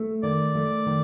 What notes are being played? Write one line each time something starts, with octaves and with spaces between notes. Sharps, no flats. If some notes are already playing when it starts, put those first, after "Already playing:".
Already playing: A3
D#3 D5
A3
D#3